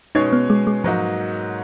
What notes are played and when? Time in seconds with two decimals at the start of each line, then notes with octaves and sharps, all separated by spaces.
0.15 B2 G#3 C#4 D#4 G#4 C#5
0.33 B3
0.50 G#3
0.67 G#3
0.84 G#2 F3 F#3 A#3 D#4